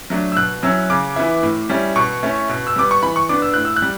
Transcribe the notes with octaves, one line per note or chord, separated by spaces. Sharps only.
F#3 A3 D4
E6
B2 F#6
F#3 C#4 E4 E6
C#3 D6
E3 B3 E4
A2
G3 C#4 E4
B2 C#6
A3 C#4 E4
B2
E6
G3 B3 D6
C#6
E3 B5
C#6
B3 D4 D6
E6
A2 F#6
E6
F#6
G3